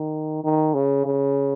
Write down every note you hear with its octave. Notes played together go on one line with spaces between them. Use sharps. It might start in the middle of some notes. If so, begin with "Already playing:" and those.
Already playing: D#3
D#3
C#3
C#3